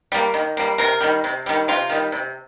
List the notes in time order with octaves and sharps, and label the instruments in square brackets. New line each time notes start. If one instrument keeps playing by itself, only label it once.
[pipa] G3 A#3
D#3
G3 A#3
C3 A#4
D#3 G3
C3
D#3 G3
C3 F4
D#3 G3
C3